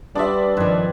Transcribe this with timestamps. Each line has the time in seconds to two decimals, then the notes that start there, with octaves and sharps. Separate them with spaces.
0.15 G3 B3 D4 F4 E5
0.57 G2 D#3 F3 C4 B4 G#5